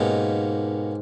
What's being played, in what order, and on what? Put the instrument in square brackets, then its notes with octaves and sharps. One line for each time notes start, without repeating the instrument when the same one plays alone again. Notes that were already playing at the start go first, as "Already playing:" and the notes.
Already playing: [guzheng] G#2 [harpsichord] B2 A#3 C#4 G4